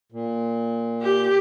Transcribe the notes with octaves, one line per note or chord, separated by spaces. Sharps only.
A#2
G4